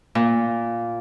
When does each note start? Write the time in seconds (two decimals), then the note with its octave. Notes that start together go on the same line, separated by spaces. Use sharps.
0.15 A#2